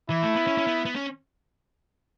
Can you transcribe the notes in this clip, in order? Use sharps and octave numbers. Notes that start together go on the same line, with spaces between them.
E3 E4
A3
B3
C#4
C#4
B3
B3
C#4